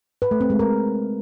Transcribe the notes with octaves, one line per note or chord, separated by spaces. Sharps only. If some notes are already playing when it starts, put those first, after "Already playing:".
B4
A3
C4
G#3
A#4